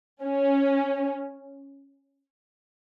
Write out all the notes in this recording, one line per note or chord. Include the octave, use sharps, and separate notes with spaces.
C#4